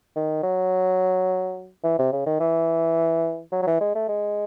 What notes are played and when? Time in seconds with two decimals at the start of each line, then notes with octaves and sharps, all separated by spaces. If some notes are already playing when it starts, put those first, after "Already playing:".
0.16 D#3
0.43 F#3
1.84 E3
1.99 C3
2.12 C#3
2.26 D#3
2.40 E3
3.52 F#3
3.62 F#3
3.67 E3
3.81 G#3
3.95 A3
4.09 G#3